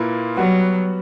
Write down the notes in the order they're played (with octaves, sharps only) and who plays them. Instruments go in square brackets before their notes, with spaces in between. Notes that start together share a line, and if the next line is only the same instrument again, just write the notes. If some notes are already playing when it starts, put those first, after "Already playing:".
Already playing: [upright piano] A#2 A#3 E4 B4
[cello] F#3 [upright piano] G3 B3 F#4